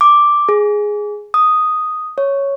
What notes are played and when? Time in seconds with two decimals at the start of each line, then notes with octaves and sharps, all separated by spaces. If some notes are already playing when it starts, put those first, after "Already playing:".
0.01 D6
0.49 G#4
1.34 D#6
2.18 C#5